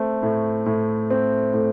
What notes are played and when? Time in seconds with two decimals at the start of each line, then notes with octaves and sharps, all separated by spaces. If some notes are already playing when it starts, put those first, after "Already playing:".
Already playing: A3 C4
0.23 A2
0.66 A2
1.10 C4
1.54 A2